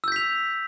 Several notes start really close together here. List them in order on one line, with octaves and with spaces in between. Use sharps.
E6 G6 B6 F7